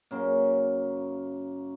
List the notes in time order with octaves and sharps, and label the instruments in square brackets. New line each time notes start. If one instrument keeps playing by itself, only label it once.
[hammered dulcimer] F#2 C#3 A#3